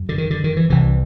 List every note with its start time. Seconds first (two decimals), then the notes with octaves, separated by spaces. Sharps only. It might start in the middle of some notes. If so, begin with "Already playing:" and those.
Already playing: F#2
0.09 D3
0.18 D#3
0.30 D3
0.44 D#3
0.57 E3
0.70 C2 C3 E3